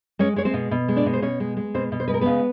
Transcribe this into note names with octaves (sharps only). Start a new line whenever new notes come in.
G#3 C#4 C#5
G#3 C#5
C4 C5
B2
B2
G#3
D4 D5
B2
C5
B2 C#4 C#5
G#3
G#3
B2 C4 C5
B2
C5
G#3 B4
A#4
C#3 B3 B4